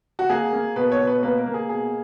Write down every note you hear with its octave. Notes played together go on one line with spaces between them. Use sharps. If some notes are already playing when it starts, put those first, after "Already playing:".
F#4
A#3 G#4
A#3
B2 B4
C#5
B2
B4
A#3 B4
A#4
A#3
G#4
B2 G#4